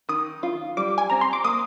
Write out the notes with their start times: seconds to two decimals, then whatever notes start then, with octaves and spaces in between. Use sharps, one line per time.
0.09 D#3 D#6
0.43 F4
0.77 G3 D6
0.98 G#5
1.10 C4 A#5
1.21 C6
1.33 D6
1.44 A#3 D#6